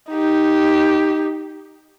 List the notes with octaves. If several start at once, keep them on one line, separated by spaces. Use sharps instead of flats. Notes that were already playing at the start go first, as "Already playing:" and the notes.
D#4 G4